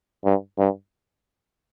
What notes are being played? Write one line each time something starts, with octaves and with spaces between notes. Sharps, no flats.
G2
G2